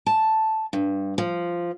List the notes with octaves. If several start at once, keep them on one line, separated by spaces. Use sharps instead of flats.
A5
G2
F3